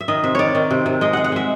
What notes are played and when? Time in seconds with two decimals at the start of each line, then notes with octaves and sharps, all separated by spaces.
0.01 E5
0.08 D#3 D#5
0.24 C3 E5
0.35 D#3 C#5 D5
0.55 D#3
0.71 C3
0.86 C3
1.01 G#3 D#5
1.13 G#3 F#5
1.24 F#5
1.32 G#3 E5